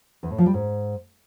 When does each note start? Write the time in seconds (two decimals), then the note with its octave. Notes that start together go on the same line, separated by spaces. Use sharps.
0.23 E2
0.31 A2
0.38 F3
0.46 G3
0.54 G#2